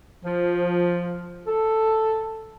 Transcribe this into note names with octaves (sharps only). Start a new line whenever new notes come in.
F3
A4